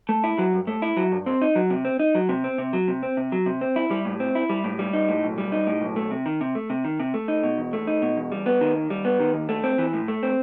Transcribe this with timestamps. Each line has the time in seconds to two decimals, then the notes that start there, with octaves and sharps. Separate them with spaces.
0.09 A3
0.24 E4
0.39 F#3
0.53 G2
0.67 A3
0.82 E4
0.97 F#3
1.12 G2
1.26 C4
1.42 D#4
1.56 F#3
1.70 C3
1.85 C4
1.99 D#4
2.15 F#3
2.29 C3
2.44 C4
2.58 C3
2.73 F#3
2.88 C3
3.03 C4
3.17 C3
3.32 F#3
3.46 C3
3.61 C4
3.76 E4
3.91 G3
4.05 A2
4.20 C4
4.35 E4
4.50 G3
4.64 A2
4.79 G3
4.93 D#4
5.09 A2
5.23 B1
5.38 G3
5.52 D#4
5.67 A2
5.81 B1
5.96 A3
6.11 C3
6.26 D#3
6.41 C3
6.55 A3
6.70 C3
6.85 D#3
7.00 C3
7.14 A3
7.28 D#4
7.43 B2
7.58 E2
7.73 A3
7.87 D#4
8.02 B2
8.17 E2
8.32 G3
8.46 B3
8.61 D#3
8.75 D#2
8.90 G3
9.05 B3
9.20 D#3
9.34 D#2
9.49 A3
9.64 C4
9.78 E3
9.93 A2
10.08 A3
10.23 C4